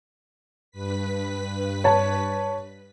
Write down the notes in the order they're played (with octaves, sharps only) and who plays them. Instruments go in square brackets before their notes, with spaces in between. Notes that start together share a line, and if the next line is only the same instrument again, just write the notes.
[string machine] G2 B4 B6
[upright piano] C#5 A5